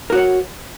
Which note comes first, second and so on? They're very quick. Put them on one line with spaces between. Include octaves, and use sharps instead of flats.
A#4 F#4 C#5 F#5